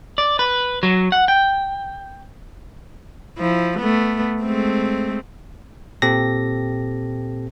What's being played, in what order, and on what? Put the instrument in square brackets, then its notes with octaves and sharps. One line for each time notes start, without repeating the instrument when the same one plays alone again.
[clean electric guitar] D5
B4
F#3
F#5
G5
[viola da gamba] F3 E4
A3 B3
G#3 A3 C4
[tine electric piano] A#2 C4 G4 A4 A#6